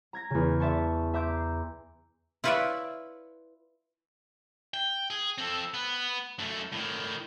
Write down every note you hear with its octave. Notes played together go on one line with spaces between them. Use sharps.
A#5 G#6 A#6
E2 C#3
D5 E5 A5 C6 C#6
E5 A#5 C6 D6 G6 D7
C7
E4 F4 B4 C#5 D5 E5
G5
G#4
C4 A4
B3
F#2 A3
A2 D#3